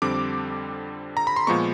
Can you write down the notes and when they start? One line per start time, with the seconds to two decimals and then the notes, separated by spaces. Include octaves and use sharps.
0.02 F2 D3 G3 C4 D6
1.17 A#5
1.27 B5
1.36 C6
1.47 A#2 F3 G#3 B3 C#6